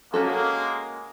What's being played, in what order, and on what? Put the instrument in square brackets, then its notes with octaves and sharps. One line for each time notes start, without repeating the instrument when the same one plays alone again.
[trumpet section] G#3 A#3 [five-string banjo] C#4 F#4 A4